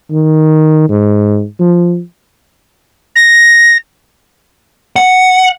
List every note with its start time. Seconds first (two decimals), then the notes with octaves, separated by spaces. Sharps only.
0.11 D#3
0.89 G#2
1.60 F3
3.16 A#6
4.96 F#5